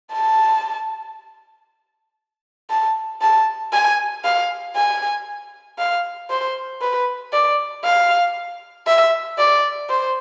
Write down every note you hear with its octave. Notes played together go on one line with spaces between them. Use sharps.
A5
A5
A5
G#5
F5
G#5
F5
C5
B4
D5
F5
E5
D5
C5